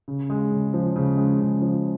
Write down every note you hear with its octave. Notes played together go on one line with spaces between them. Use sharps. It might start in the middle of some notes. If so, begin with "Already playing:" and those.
C#3
G#3
C#3
F3
C#3
G#3
C#3
F3